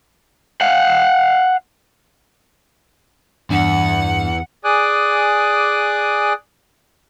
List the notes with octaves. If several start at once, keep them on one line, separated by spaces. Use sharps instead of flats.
F5 F#5
E2 G2 D4 F#5
G#4 D5 G#5 D6 D#6 F#6